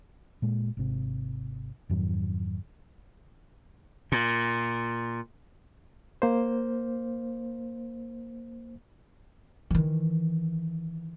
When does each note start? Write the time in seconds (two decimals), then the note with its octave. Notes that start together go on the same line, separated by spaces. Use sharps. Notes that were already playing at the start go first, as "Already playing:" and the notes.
0.42 A#2 G#3
0.77 G#1 C3
1.89 F2 G#2 D#3 F#3
4.12 A#2
6.22 A#3 C5
9.71 D#3 E3